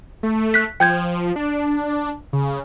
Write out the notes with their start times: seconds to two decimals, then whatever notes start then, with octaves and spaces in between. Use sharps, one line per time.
0.23 A3
0.54 F#6 B6
0.80 F3 G5 G6 G#6
1.36 D4
2.33 C#3